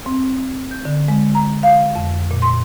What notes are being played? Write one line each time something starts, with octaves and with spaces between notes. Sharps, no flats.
C4
G6
D3
G#3
A#5
F5
F2
A#2
C6